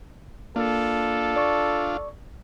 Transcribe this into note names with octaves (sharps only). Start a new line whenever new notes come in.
A#3 D4 F4 A4
D5 C#6